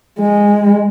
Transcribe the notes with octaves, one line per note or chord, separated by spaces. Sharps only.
G#3